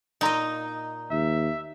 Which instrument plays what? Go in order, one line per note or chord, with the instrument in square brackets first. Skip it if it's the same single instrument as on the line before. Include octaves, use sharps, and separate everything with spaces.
[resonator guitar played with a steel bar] A#2 A#5 [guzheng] D#4 D#5
[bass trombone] D#2 [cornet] E5